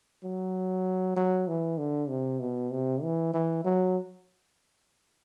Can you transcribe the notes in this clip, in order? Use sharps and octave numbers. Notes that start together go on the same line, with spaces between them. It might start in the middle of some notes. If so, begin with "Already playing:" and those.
F#3
F#3
E3
D3
C3
B2
C3
E3
E3
F#3